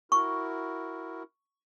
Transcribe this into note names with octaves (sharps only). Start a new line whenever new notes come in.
E4 F#4 A#4 C#6